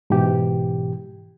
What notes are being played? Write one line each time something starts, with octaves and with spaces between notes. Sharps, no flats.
G#2 B2 E3 G4